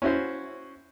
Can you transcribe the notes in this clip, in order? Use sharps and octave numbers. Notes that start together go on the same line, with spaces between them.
C#4 E4 F#4 C5